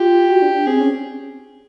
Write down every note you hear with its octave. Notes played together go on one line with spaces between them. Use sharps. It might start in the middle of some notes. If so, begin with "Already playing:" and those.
Already playing: F4 G4
F#4
D4
D4
C4 G#4
C#4